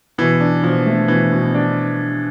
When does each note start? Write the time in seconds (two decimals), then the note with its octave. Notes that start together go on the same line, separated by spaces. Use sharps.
0.18 B2 E3
0.40 D4
0.63 B2 F3
0.86 A3
1.08 B2 E3
1.32 B2
1.54 D4